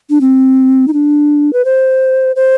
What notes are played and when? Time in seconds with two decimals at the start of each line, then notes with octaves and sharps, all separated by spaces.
0.10 D4
0.21 C4
0.88 D#4
0.93 D4
1.53 B4
1.65 C5
2.36 C5